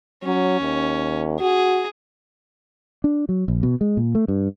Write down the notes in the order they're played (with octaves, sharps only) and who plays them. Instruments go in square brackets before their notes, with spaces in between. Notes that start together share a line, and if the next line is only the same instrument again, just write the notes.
[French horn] F#3 [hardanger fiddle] C#4
[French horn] D#2
[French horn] F#4 [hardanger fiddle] G#4
[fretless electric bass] D4
F#3
A#1
B2
G#3
A#2
A3
G2